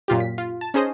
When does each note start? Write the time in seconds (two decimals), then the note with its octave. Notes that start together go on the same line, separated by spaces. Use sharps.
0.08 F#2 A#2 F4 G4
0.20 B6
0.38 F4
0.61 A5
0.74 C#4 D#4 G#4 C5 D#5